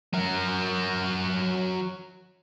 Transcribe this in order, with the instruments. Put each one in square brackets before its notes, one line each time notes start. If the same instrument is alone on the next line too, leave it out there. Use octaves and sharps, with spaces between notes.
[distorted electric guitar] F#3 A#4